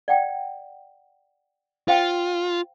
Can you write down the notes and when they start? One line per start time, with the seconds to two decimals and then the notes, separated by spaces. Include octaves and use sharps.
0.08 D5 F#5 G5
1.88 F4 C5 F5 G5